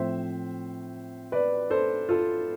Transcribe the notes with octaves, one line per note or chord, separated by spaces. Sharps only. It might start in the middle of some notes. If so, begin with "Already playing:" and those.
Already playing: A2 F3 C4 C5 E5
B4 D5
A4 C5
F4 A4